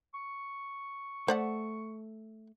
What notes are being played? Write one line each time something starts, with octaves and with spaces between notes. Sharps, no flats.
C#6
A3 C5 D5 F#5